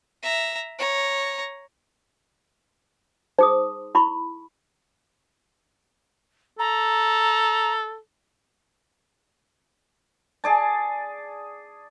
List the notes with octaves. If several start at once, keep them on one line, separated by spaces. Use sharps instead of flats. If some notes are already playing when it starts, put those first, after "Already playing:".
E5 A#5
C#5 A#5
D#4 G#4 C5 D#6
E4 B5 C#6
A4 A#5
G#4 D5 A5